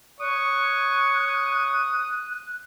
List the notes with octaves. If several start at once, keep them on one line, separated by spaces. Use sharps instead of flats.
C#5 C#6 D#6 F#6